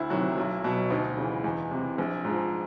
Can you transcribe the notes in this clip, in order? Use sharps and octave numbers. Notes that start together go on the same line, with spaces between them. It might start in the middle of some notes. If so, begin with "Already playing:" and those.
Already playing: D2 E4
C3 D#3 F#3
B1
B2 F#3
D2 D#4
C#3 E3
E2
C3 E3
A#1
G#2 F3